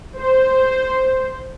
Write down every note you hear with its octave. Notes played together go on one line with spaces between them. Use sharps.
C5